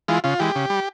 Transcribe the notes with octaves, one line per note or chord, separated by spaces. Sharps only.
E3 G#3 F4
C#3 F4
E3 G#3 G4
C#3
G3